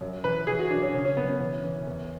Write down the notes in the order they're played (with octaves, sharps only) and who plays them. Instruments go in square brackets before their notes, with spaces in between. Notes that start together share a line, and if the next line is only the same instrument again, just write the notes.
[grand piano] F#2
E3 B4
E3 G#4
F#4
F#2 D4
C#4
C#3 C#4
C#4
F#2 B3
C#4
E3
E3
E2